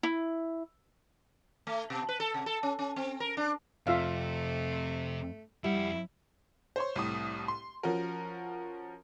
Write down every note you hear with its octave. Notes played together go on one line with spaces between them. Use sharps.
E4
A3
B2
B4
A4
C3
A4
C#4
C#4
C4
A#4
D4
F2 C3 A3 F4 E5 F5
F2 G3 E4 F#5
C5 C#5 C6
C2 A2 D#6
C6
F3 C#4 F#4 A#4